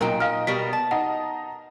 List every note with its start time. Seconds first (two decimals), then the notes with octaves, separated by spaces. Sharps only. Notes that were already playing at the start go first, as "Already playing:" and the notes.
0.01 B1 A#2 D#4 A#4 G5
0.20 D#5 F5 F6
0.47 B2 G3 A#4 B6
0.73 A5
0.91 D#4 D#5 F#5 A#5